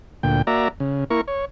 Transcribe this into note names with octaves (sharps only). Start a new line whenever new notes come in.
D2 A#2 G5
A#3 F#4 D5 E5 A#5
C#3
A#3 E4 A#4 C#6
C#5